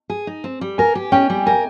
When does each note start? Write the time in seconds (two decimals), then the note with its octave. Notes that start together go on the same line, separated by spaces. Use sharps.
0.10 G#4
0.27 D#4
0.44 C4
0.61 G3
0.78 A#4 G#5
0.95 G4
1.12 C#4 G5
1.30 G3
1.46 A#4 G#5